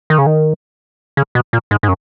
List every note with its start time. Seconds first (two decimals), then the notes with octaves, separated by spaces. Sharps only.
0.10 D#3
0.18 C#3
0.26 D#3
1.17 C#3
1.35 B2
1.53 A#2
1.71 G#2
1.83 G#2
1.88 F#2